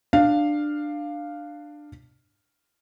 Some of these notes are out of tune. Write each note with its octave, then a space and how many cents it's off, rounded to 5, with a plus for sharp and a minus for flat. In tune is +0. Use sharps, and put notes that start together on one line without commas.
D4 +15 F5 +0